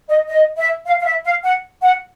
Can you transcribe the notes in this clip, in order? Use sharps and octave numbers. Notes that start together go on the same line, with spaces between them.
D#5
D#5
E5
F5
F5
E5
F5
F#5
F#5